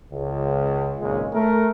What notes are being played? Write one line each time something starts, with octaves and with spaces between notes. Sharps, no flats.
C#2
G#1 C#2 A#2 G#3
A3 A#4